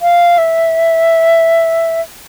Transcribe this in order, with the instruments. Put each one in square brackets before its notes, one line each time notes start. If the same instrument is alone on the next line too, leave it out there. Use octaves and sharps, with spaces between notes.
[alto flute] F5
E5